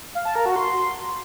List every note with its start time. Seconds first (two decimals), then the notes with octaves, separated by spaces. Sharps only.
0.15 F5
0.25 A5
0.35 A#4
0.46 F#4
0.56 C6